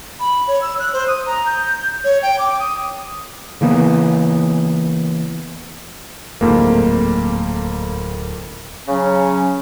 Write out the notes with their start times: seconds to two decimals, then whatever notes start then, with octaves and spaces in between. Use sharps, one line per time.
0.20 B5
0.48 C#5
0.62 E6
0.79 F#6
0.93 C5
1.08 D#6
1.26 A#5
1.46 G6
2.04 C#5
2.22 G5
2.39 D6
2.59 D#6
3.61 C#3 E3 A#3 B3
6.41 D1 G#1 F2 G#2 A3 A#3
8.88 C#3 F#3 C#4